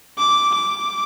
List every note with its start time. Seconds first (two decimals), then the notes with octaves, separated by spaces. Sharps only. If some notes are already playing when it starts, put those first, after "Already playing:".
0.18 D6
0.55 D6